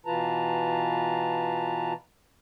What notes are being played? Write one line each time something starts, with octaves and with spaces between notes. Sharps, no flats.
B2 E3 F4 B4 A5 A#5